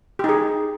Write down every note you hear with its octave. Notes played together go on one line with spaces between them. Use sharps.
D#4 G4 G#4